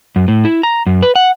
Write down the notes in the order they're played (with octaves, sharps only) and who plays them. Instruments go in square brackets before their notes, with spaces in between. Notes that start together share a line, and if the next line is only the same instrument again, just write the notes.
[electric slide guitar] F#2
A2
E4
A#5
F#2
B4
F#5